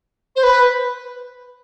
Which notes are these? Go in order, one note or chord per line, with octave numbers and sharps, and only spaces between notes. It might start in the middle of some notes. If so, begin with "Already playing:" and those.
C5
B4